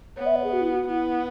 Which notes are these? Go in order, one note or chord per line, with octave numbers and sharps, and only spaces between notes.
B3 C#5
E5
C#5
G#4
F#4
E4
F#4
B3 E4